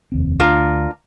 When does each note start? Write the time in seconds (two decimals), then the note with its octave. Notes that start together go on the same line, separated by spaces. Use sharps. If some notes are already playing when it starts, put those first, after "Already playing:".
0.12 F1 D#2 C4
0.40 D2 D4 F4 A#4